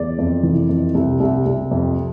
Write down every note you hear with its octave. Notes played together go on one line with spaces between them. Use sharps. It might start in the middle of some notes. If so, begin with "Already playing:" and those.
Already playing: E2 D5
F2
E3
F2
C2
C2
C2
F2